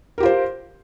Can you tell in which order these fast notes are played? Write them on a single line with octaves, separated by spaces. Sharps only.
A#4 G4 F4 C5